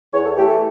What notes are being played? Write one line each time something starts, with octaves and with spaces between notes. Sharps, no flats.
E2 C#5
A4
E3 A3 G4
A4